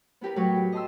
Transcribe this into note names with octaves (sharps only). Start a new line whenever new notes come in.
B3 E4 G4 A#4 B4
A2 F#3 B4 C#6
G4
D#5 A5 C6 E6